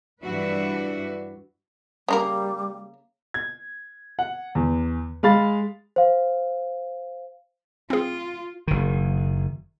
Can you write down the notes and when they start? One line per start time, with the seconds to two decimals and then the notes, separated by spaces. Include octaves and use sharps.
0.23 G2 E3 D4 F#4 B4 E5
2.09 C#3 G3 A#3 A#4
3.34 G#6
4.19 F#5
4.55 E2
5.23 G#3 F5 B5 A6
5.96 C5 F5
7.90 C4 F4 G#4
8.68 F#1 D#3